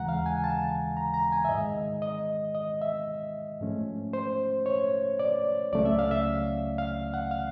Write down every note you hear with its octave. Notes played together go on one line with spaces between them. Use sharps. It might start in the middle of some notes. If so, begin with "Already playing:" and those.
Already playing: D#2 C#3 E3 G#3 F#5 A#5
F5
G#5
A5
A#5
A#5
G#5
E5
G#2 D#3 G#3 D#5
D#5
D#5
E5
G#2 F3 A3 C#4
C5
C#5
D5
C#2 C#3 F#3 A3 C#4 D5
E5
F5
E5
F5
F#5
F5